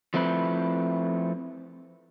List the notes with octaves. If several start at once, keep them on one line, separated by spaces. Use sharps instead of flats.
F3 A3 C4 E4 B4